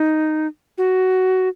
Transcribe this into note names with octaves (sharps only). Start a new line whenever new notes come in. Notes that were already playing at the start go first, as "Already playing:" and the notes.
Already playing: D#4
F#4